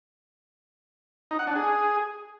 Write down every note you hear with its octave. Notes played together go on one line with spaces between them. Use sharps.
D#4
F#5
D4
G#4